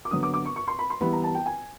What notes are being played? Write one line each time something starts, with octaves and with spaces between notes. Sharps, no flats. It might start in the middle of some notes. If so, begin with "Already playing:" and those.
D6
D3 F#3 B3 D#6
D6
D6
C#6
C#6
C6
B5
C6
E3 G3 B3 E4 B5
A#5
A5
G5
G#5